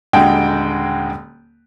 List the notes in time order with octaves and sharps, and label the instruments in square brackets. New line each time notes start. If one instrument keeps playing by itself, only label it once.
[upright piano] D#1 D3 G#3 F#4 G5